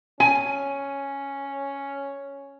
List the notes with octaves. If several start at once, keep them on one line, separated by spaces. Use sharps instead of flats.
C#4 G#5